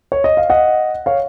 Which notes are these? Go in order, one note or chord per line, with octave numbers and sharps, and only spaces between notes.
C#5
D#5
F5
D#5 F#5
C#5 F5